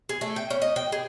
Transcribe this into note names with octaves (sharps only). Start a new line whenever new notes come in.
G#4
A3
G5
C#4
D#5
G5
G#4